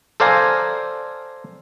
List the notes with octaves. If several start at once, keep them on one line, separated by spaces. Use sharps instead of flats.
A4 C5 D5 F5 G#5 A#5